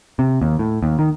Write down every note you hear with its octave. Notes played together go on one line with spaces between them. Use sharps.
C3
D#2
A2
D#2
D#3